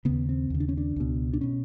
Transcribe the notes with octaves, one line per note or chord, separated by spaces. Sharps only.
D#2 C#3 B3
C4
D#2 C#3
D4
C#4
D4
C#2 B2
D4
B2 C#4